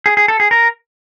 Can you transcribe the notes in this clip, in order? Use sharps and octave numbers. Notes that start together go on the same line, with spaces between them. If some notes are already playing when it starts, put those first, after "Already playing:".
G#4
G#4
A4
G#4
A#4